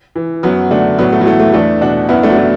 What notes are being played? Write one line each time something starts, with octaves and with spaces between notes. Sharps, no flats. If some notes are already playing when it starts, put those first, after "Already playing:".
E3
F#2 F#3 B3
D3 A3 D4
A2 F#3 B3
A3
F#3
E3 A3
A3
E2 A3 D4
B2 D4 F#4
F#2 B3 E4
A3 D4
F#3
E3 A3